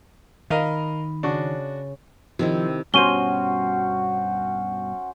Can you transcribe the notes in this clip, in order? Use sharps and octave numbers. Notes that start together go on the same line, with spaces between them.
D#3 A#4 D#5 F5 B5
C#3 D4 F#4
C3 D#3 F3 E4
G2 B2 C#4 F#4 C5 F#5 D#7 G7